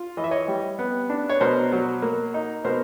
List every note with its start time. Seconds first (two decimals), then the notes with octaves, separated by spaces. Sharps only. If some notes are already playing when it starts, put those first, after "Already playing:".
Already playing: F4
0.17 E3 D#5
0.24 E5
0.31 C#5 D#5
0.48 G3
0.79 B3
1.10 D4
1.29 C#5
1.41 B2 A#4 C5
1.72 F#3
2.02 A#3
2.34 D#4
2.64 B2 A#4 C5